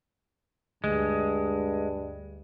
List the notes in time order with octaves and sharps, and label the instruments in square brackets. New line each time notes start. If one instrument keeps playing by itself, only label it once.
[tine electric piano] D2 [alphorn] G2 [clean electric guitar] G#3